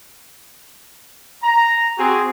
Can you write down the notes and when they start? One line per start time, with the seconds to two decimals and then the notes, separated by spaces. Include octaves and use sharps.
1.44 A#5
1.98 C4 F#4 G#4